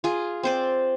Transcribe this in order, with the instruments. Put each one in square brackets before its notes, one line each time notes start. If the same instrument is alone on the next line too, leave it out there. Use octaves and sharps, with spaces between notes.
[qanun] F4 G#4
C4 C5 D5